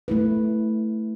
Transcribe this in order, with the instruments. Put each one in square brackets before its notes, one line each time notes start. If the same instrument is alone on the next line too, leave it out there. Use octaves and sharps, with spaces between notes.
[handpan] A3 E4 B4